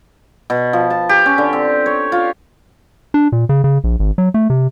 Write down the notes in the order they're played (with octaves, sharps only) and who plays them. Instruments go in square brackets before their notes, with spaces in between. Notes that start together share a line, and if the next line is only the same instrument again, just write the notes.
[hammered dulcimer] B2
F3
A5
G4
C#4
D3
C4
C#5
F4
[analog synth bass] D4
A#2
C#3
C#3
A#1
G#1
F#3
A3
C3